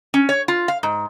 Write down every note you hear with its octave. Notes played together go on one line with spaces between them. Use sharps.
C#4
C#5
F4
F5
G#2